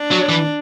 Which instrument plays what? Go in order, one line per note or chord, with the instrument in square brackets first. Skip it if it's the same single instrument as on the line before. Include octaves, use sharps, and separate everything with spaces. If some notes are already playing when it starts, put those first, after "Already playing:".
Already playing: [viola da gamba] D4
[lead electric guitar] F#3
E3